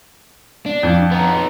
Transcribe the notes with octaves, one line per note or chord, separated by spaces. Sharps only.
D4
F2
B3 D#4